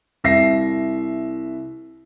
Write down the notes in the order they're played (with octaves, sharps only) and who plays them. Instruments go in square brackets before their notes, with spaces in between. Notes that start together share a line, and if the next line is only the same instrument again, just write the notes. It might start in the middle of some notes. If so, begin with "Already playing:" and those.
[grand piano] C2 E5 A#6 C7